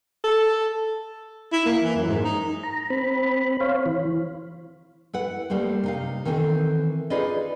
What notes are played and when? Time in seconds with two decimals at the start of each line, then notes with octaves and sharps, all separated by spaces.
0.24 A4
1.52 E4
1.65 A#3
1.83 E3
1.96 F#2
2.08 G#2
2.24 D#4
2.63 A#5
2.90 C4 B5
3.60 C5 C#5 F5
3.86 E3
5.13 E4 B4 F#5
5.50 G3 A3 A#3 C4
5.84 C3 D#4 F5
6.25 D#3 E3 C4 D#4 A4
7.10 D#4 F4 G#4 B4 D5 D#5